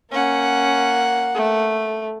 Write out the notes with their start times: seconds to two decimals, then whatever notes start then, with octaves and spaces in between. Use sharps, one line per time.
0.11 A#3 C#4 F#5
1.35 A3